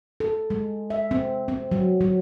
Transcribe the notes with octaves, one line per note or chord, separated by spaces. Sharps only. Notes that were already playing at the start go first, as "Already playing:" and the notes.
A4
G#3
E5
C4
C4
F#3
F#3